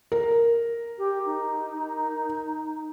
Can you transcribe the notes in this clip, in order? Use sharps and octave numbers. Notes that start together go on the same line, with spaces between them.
A#4
G4
D#4